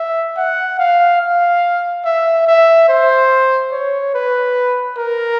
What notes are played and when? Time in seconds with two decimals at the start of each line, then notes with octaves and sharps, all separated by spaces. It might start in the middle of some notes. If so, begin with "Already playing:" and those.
Already playing: E5
0.37 F#5
0.79 F5
1.21 F5
2.05 E5
2.47 E5
2.89 C5
3.72 C#5
4.15 B4
4.98 A#4